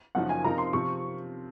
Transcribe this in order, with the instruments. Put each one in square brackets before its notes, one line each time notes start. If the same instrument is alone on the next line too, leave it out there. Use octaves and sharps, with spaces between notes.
[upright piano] F#1 F#2 F3 A#3 D#4 [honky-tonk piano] F#5
[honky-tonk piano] G#5
[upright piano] C3 F3 C4 D#4 A#4 [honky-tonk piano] A#5
[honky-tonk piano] C6
[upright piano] C3 F3 C4 [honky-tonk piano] C#6